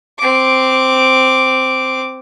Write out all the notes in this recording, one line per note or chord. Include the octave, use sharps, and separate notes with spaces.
C4 D6